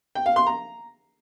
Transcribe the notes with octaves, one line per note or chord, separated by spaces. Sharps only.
G5
F5
C6
A#5